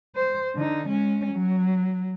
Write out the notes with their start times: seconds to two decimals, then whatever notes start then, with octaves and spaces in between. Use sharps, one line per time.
0.16 C5
0.55 D3 D#4
0.88 G#3 C#4
1.33 F#3